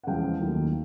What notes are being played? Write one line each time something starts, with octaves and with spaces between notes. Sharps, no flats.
F#5
E2 C#3 F3 G#3 F5 G5
D#2 D#3 F#3 A3